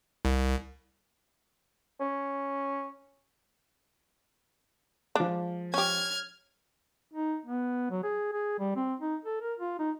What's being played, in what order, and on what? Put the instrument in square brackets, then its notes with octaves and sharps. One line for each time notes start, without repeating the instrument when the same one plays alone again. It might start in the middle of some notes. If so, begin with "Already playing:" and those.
[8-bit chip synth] C2
[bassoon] C#4
[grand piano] F3 G#3 [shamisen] D4
[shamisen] C#4 G4 [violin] F6 G#6
[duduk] D#4
B3
F#3
G#4
G#4
G3
C4
D#4
A4
A#4
F4
D#4